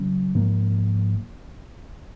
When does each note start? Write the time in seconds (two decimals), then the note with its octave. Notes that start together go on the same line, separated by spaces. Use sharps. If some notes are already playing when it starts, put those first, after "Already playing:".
Already playing: C#3 F#3 C#4
0.35 G#2 F3 A#3